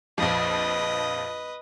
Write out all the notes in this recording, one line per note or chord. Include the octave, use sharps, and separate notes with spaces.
A#1 F2 F3 B4 D#5